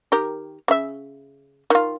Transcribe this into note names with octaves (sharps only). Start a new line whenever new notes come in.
D#3 G4 A#4
C#3 E5
D#3 F4